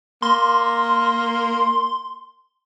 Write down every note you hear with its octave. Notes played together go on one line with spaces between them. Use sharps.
A#3 C6